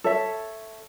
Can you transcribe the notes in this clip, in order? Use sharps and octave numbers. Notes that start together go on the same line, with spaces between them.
A4 C#5 E5